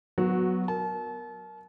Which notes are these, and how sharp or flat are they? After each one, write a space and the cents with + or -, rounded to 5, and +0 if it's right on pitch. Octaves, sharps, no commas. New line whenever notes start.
F#3 +0 B3 +0 F#4 -15
A#4 +0 A5 -35